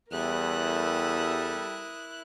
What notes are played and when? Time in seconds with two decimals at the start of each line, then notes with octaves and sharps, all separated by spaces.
0.12 E2 G3 E4 A4 A#4 D#6 F#6